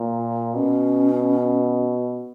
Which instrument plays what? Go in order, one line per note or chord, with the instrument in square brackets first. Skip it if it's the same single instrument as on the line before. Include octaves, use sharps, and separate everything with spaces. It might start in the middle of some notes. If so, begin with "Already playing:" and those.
Already playing: [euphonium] A#2
[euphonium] B2 [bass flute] C#4